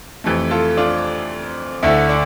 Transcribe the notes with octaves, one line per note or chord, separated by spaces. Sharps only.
F2 C3 E3 A3
F4 A4
D4 F4
D2 D3 A3 E4
D4